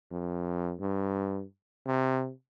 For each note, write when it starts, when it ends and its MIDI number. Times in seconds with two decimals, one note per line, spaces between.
0.11 0.74 41
0.80 1.44 43
1.86 2.32 48